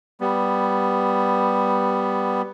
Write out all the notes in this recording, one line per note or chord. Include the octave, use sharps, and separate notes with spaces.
G3 B3